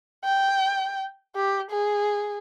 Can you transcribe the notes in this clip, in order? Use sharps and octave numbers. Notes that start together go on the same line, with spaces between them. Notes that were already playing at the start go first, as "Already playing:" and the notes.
G5
G4
G#4